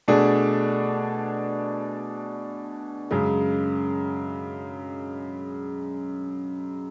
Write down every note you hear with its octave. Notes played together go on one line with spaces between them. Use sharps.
B2 A3 D4 G#4
F#2 C#3 G#3